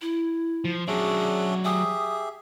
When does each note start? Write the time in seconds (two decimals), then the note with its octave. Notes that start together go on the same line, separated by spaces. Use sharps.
0.01 E4
0.65 F3
0.88 F#3 C#4 D4 G#4 D5 E5
1.64 G4 G#4 E5 D#6